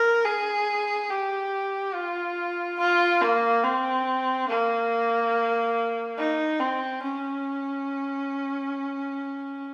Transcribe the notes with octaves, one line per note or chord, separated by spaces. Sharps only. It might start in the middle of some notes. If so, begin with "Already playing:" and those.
Already playing: A#4
G#4
G4
F4
F4
A#3
C4
A#3
D#4
C4
C#4